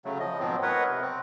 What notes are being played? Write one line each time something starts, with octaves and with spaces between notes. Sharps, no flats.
C#3 F#3 A3
F3 D#5
G#2 B2 F3 F#3 C4
A#4 B4 C#5 D#5 F#5
C3
C4